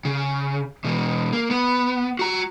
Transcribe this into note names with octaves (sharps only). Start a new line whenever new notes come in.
C#3
B2 E3
A#3
B3
F#4 A#5